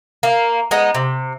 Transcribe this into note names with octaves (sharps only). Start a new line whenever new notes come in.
A#3
G#3 B3 D#4
C3